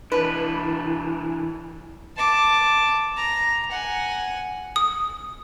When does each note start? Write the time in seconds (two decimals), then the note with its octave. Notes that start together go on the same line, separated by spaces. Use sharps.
0.12 E3 D4 B4
2.17 A5 D6
3.17 A#5
3.71 F#5 G#5
4.76 D#6